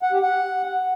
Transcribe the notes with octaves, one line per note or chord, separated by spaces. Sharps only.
F#5
G4
F#5